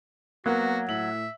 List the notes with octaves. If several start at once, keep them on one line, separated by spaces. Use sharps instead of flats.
F#3 A#3 B3 F#4
A2 E5 F#7